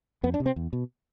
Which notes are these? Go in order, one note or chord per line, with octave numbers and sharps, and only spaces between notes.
F2 B3
D4
C3
C4
E2
B2